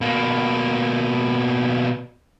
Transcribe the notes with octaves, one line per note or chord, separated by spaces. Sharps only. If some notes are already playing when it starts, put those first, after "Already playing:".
B2 A#3